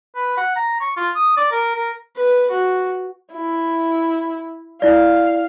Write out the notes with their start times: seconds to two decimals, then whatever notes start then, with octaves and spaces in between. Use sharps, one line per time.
0.15 B4
0.37 F#5
0.56 A#5
0.81 C#6
0.97 F4
1.15 D#6
1.37 D5
1.51 A#4
1.75 A#4
2.16 B4
2.51 F#4
3.33 E4
4.82 E4 D5 F5